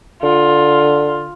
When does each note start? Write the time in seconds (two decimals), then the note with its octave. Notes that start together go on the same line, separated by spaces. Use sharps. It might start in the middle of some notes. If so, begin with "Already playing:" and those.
0.23 D3 F4